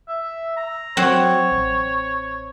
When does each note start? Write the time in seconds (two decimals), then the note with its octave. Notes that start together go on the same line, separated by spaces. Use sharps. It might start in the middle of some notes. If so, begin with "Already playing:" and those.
0.08 E5
0.57 A#5
0.97 F#3 C4 C#5 F#5
1.52 A1